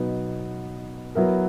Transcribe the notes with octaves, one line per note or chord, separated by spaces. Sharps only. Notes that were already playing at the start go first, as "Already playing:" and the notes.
Already playing: B2 F#3 B3 D#4
F#3 B3 E4 A#4